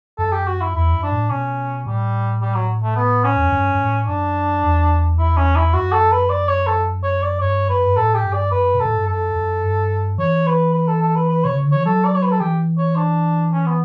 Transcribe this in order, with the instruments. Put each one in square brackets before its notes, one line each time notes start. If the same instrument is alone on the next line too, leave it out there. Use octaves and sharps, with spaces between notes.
[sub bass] F#2 [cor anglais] A4
[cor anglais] G4
F#4
E4
[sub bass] E2 [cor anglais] E4
[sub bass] F#2
[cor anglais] D4
[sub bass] A2
[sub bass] B2 [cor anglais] C#4
[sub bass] A2 [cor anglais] G3
[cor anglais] G3
F#3
A3
B3
C#4
[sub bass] E2
F#2
G2
G2
A2
[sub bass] F#2 [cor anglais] D4
[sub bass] E2
[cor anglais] E4
C#4
E4
[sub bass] F#2 [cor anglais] F#4
[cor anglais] A4
B4
D5
C#5
A4
C#5
D5
[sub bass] G2 [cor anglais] C#5
[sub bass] F#2 [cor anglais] B4
[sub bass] G2
[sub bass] A2 [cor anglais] A4
[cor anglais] G4
[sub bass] G2
[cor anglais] D5
[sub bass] F#2 [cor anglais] B4
[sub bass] B2
[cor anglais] A4
[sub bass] A2
G2
[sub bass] F#2 [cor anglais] A4
[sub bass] F#2
G2
[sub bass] E3 [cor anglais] C#5
[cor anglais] B4
B4
A4
A4
B4
B4
[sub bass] B2 [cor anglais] C#5
[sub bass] C#3
D3
[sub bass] E3 [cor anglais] C#5
[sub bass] F#3 [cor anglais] A4
[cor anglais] D5
C#5
B4
A4
[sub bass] E3 [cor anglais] G4
[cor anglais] C#5
D4
C#4
B3